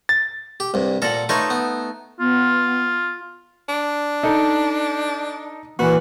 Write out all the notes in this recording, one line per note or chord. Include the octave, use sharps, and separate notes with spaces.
A6
G4
C2 G2
A#2 A4 A#4 F#5
A3 D#4 F4 B4 C#5
B3
B3 F4
D4
D#4 A4
A#2 E3 F#4 B4